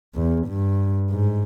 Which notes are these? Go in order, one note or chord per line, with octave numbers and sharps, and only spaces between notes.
E2
G2
G#2